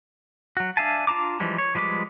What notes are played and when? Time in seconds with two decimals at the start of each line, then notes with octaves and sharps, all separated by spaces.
0.57 F#3 F#4
0.77 D4 E5 F5 G#5 A5
1.07 D4 F4 A5 A#5 D6
1.40 E3 F3 G3 G#3
1.58 C#5
1.75 F3 G3 G#3 B4 D6